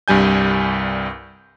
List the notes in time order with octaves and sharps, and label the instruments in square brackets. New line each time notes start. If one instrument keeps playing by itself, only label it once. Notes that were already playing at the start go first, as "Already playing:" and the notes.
[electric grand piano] C2 G2 G3 G#5 G6